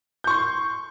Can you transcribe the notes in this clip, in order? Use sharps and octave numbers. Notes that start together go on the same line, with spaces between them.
C6 C#6 G6